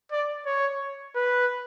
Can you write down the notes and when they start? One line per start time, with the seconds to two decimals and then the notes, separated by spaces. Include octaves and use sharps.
0.12 D5
0.46 C#5
1.15 B4